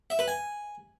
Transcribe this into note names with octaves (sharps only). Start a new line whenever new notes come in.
E5
B4
G#5